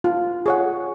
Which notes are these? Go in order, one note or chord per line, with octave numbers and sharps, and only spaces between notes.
F4
G#4 C#5 F#5